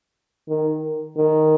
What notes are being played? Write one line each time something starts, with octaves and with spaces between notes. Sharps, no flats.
D#3
D#3